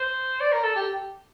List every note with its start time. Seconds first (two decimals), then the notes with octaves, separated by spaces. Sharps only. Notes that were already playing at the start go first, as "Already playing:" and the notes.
Already playing: C5
0.40 D5
0.52 A#4
0.64 A4
0.76 G4